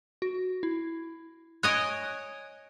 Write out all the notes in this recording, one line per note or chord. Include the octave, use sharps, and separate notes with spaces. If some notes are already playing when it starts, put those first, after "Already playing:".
F#4
E4
C#5 D#5 G#5 F#6 D7